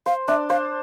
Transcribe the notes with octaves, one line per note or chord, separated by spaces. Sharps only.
C5 F5
D4 E5
C5 F5